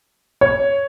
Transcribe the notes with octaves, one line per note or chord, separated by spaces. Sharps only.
C#5